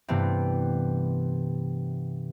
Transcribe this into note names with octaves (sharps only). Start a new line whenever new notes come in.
G2 C3 E3 A3 B3 C4